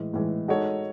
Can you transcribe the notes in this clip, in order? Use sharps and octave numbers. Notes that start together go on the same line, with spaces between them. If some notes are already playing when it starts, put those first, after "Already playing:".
Already playing: A2 E3 G#3
A2 E3 G#3
G#3 D#4 F#4 A4 C#5